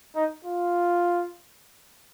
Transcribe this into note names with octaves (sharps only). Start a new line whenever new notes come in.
D#4
F4